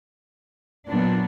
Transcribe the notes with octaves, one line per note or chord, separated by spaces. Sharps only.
A#2 F#3 B3 D4